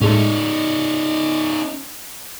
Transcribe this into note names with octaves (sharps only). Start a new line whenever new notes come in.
A2 G#3 A3 C#4 D#4